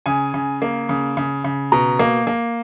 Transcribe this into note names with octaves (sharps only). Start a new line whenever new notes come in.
C#3 G#5
C#3
A#3
C#3
C#3
C#3
B2 A#5
A#3
A#3